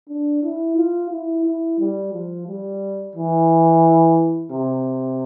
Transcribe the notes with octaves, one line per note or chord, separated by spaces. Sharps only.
D4
E4
F4
E4
E4
G3
F3
G3
E3
C3